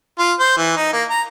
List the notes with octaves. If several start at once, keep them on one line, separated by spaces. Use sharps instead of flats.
F4
C5
E3
D#4
A#3
A#5